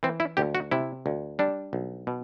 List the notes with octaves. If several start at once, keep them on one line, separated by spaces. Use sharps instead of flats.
E3 C4
E4
D2 G4
F#4
C3 E4
D2
G3 D4
B1
B2